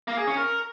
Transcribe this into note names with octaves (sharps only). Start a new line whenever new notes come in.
A#3
G#4
C#4
A#4